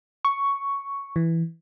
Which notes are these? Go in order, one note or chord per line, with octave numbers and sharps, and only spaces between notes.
C#6
E3